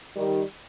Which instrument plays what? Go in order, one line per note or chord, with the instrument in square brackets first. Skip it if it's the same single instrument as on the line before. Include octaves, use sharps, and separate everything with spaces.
[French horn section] D#3 G3